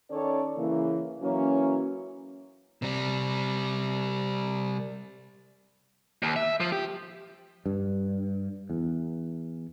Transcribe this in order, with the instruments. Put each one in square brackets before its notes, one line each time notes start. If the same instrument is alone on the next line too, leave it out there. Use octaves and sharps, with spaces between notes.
[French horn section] D#3 C#4 A4 C#5 D5
C#3 E3 A#3
E3 F#3 A#3 C#4
[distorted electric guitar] C3 G3
[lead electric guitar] D#2
E5
F3
G4
[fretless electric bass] G2
E2